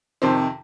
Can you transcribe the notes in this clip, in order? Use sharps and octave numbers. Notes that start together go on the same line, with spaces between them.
F2 C3 D#3 C5